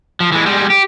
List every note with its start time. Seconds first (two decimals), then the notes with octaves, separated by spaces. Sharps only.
0.20 F3
0.32 E3 G#3
0.46 G3 G#3
0.70 G4